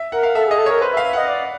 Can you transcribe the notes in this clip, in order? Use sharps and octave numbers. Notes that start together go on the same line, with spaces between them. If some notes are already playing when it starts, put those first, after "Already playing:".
Already playing: E5
A#4 F#5
F5
A4 E5
G#4
D#5
A4
A#4 C#5
B4 C5
E5
F5
E5
D#5 F#5
D5